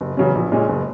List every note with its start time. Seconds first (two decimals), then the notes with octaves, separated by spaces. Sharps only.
0.01 F#1
0.17 E2 C#3 F#3 C#4
0.35 A#1
0.52 A#2 G#3 C#4
0.69 F#1